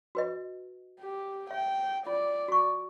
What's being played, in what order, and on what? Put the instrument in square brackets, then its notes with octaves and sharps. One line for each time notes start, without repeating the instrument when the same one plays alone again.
[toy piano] F#4 B4 D#5
[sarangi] G4
[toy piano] E5 [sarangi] G5
[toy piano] F4 [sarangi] D5
[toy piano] F#4 C#6